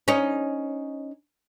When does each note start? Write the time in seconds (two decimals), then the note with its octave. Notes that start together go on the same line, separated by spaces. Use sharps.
0.08 C#4 D#4